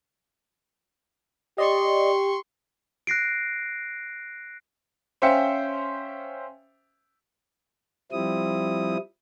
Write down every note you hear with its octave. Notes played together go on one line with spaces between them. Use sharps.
G4 D5 D#5 C6 C#6
F#6 A#6 C7 D7
C#4 C5 E5 F5 G5 C#7
F3 G3 C4 E4 D#6